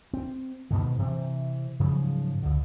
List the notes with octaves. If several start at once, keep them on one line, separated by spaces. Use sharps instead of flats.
C4
G#2 B2 D3 D#3
C3 E3 C4
G#2 C#3 F3 F#3
C#2 D3